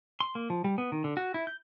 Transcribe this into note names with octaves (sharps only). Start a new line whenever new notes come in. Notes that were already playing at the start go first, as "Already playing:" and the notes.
C6
A#3
F3
G3
B3
D#3
D3
F#4
E4
G6